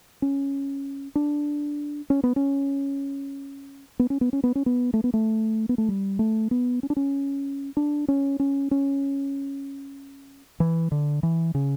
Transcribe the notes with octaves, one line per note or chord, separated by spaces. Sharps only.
C#4
D4
C#4
B3
C#4
B3
C#4
B3
C#4
B3
C#4
B3
A3
B3
A3
B3
A3
G3
A3
B3
C#4
D4
C#4
D4
C#4
C#4
C#4
E3
D3
E3
C#3